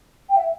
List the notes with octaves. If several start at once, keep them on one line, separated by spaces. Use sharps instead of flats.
G5
E5